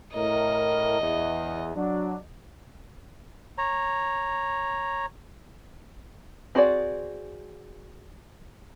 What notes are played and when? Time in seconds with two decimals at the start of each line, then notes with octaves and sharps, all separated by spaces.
0.14 A2 A#4 D#5
1.00 E2
1.76 F#3 D4
3.58 C#5 A#5
6.55 C4 F#4 G#4 A#4 D5